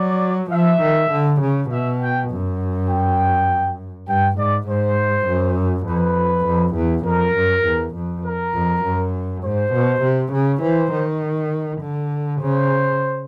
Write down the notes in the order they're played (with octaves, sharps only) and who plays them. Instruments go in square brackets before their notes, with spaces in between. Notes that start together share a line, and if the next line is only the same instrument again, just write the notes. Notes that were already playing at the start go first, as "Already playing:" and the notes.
Already playing: [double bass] F#3 [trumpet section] D5
[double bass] F3 [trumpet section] E5
[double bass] D#3
D3
C#3
[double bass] B2 [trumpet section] E5
[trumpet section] G5
[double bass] F#2
[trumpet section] G5
[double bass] G2 [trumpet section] G5
[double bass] G#2 [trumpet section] D5
[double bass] G#2 [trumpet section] C5
[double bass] F#2
[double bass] F2 [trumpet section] B4
[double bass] F2
E2
[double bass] F2 [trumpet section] A#4
[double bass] F#2
E2
F2
[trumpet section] A#4
[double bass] F2
F#2
[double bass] G#2 [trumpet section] C5
[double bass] B2
C3
C#3
[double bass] E3 [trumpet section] C5
[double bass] D#3
D3
[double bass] C#3 [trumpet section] C5